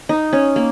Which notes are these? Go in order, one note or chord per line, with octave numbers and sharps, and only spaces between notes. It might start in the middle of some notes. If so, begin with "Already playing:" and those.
D#4
C#4
A#3